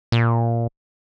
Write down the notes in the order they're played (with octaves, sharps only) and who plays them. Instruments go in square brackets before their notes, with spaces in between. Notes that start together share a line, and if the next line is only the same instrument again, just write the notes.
[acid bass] A#2